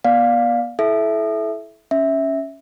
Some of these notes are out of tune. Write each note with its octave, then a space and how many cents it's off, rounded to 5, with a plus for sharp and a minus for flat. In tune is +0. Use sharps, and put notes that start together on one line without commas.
B3 -40 D5 +0 F5 +10
E4 +0 A4 -35 E5 +0
C#4 +0 E5 -10